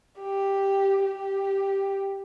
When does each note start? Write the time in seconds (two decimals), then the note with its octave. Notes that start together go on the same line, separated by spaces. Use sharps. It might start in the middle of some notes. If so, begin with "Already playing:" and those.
0.21 G4
1.06 G4